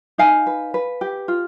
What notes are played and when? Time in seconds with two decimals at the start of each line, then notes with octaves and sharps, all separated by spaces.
0.18 D#4 F5 G#5
0.47 B4
0.74 B4
1.01 G4
1.28 F4